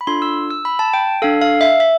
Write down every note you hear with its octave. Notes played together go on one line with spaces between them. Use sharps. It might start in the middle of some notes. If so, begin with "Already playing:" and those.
B5
D4 F4 A4 C6
E6
E6
B5
A5
G5
D4 A4 F5
F5
E5
E5